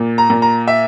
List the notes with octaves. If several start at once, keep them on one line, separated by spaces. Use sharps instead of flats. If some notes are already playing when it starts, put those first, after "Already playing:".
Already playing: A#2
A#5
A#2
A#5
E5